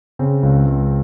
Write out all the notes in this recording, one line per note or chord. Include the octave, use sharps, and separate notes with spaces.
C#3 C4
C#2
C#2